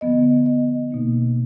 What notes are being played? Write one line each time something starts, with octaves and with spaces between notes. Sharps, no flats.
D3 F3 B3 D#5
D#5
B2 A#3 D#4